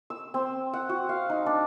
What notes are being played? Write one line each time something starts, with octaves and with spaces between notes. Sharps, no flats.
E6
C4
F#5
F#4
F5
D#4
D4